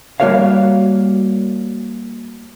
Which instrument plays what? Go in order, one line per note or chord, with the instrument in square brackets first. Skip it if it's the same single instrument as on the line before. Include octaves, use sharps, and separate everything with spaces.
[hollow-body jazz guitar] G3 A#3 F#4 A#4 C#5 F5